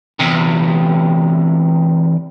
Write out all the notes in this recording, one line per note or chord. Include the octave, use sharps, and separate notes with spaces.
E2 C3